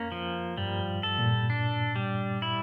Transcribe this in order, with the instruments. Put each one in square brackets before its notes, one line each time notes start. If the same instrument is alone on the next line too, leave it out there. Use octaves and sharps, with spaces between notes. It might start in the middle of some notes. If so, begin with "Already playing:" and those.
Already playing: [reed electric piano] F2 [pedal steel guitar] A#3 C#4
[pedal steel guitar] F3
[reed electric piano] G2 [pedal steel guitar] G3
[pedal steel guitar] A4
[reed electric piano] A#2
[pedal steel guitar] D4
G3
E4